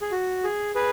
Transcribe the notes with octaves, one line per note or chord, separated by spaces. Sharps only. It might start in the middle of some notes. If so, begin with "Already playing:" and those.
G#4
F#4
G#4
G#4 B4